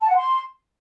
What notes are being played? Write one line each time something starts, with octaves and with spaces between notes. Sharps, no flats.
A5
F#5
C6